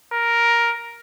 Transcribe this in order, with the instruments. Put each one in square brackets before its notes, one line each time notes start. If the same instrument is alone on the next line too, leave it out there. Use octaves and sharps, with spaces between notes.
[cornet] A#4